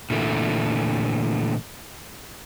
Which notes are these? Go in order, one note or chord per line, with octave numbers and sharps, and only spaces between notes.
A#2 D3 E3 A3